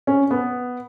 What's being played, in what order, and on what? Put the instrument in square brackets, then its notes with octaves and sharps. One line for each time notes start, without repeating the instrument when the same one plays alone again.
[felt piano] C#4
B3